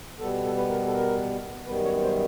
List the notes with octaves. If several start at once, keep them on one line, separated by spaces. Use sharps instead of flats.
B2 G3 B3 A4
A4
B4
A#4
A4
A#4
F#2 D#3 G3 B3 B4
C#5
C5